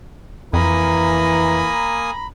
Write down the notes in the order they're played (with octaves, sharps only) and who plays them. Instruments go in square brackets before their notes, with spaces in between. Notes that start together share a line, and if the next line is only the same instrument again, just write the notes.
[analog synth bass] F2 [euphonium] E3 [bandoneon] A#3 G#5 D#6 [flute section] A#5 B5